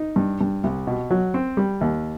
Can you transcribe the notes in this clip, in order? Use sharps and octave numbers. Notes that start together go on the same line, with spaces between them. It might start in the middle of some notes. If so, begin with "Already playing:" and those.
Already playing: D#4
G2
G2
C2
B2
F#3
C4
G3
D#2